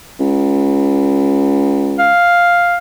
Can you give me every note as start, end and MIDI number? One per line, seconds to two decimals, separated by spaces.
0.19 2.13 37
1.99 2.77 77